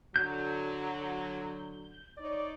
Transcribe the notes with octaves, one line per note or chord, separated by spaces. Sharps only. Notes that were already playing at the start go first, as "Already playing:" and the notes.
D3 F#3 G6
D#4 C#5 D5